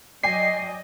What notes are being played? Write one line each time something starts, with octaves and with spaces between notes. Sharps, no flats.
F#3 D5 D#5 G5 G#5 C7